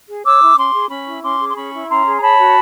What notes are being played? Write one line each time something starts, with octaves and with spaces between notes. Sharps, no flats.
G#4
C#5 D6 E6
E4
C#4 C6 D6
G#4
C#4 B5 C#6
E4
C#4 C6 D6
G#4
C6
C#4 B5 C#6
E4
C#4 A#5 C6
G#4
A#5
C#5 A5 B5
F#4